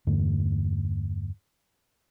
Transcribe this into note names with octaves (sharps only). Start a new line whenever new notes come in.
E2 G2 D3 A3